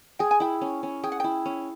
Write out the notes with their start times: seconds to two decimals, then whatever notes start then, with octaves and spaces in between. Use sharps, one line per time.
0.19 G#4 G5
0.31 G#5
0.40 E4 G5
0.61 C#4
0.83 C#4
1.04 G#4 G5
1.12 F#5
1.20 E4 G5
1.45 C#4